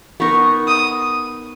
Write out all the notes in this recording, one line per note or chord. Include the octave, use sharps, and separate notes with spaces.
B3 D#4 A#4 C#6
D#6